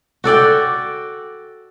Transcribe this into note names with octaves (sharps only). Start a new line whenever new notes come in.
F#4 A4 D5 G5